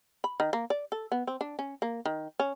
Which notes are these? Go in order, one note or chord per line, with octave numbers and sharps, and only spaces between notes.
B5
D#3
A#3
D5
A4
B3
C4
D4
C#4
A#3
D#3
C#4